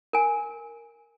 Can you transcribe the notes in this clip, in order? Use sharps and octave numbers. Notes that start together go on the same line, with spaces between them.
A#4 G#5